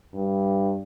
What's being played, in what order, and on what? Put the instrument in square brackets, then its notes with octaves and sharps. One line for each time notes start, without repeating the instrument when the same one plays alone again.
[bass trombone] G2